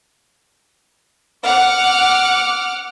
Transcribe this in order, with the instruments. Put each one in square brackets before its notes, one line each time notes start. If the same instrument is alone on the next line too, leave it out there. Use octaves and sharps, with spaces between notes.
[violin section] F#5 D6 F6